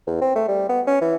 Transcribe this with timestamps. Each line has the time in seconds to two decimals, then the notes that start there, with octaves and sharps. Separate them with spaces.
0.07 E2
0.21 C4
0.35 A3
0.48 G3
0.69 B3
0.87 C#4
1.01 E3